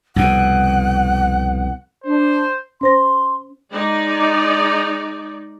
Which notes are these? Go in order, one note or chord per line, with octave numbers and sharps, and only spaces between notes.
C2 F2 B2 F#5
D4 C5
C#4 C5 C6 A#6
G#3 D#4 D5